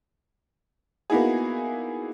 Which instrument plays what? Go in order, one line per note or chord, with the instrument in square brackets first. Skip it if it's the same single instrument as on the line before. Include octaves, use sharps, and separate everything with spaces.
[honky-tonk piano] A#3 B3 D#4 E4 F#4 G#4